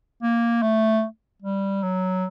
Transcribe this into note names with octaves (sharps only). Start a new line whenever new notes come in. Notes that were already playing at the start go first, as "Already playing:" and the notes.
A#3
A3
G3
F#3